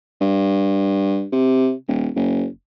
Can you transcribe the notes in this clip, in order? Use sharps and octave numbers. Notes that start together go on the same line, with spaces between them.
G2
C3
D#1
F#1